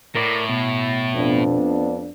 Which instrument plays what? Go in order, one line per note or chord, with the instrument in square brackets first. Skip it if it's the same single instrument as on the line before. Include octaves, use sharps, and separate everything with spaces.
[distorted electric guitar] A2 [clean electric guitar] A#4 D5
[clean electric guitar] B2
[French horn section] F2 B3 D4